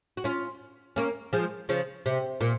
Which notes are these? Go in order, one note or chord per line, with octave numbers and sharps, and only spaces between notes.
F#4
C#4 F4
A#3 C#4
F3 G#3
C#3 F3
C3
A#2